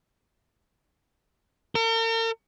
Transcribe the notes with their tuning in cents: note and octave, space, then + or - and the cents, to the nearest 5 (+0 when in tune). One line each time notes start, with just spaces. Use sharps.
A#4 -45